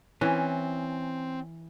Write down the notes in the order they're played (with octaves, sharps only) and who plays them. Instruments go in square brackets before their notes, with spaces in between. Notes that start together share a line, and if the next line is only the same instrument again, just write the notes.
[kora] E3 [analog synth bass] C4 [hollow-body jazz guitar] C#4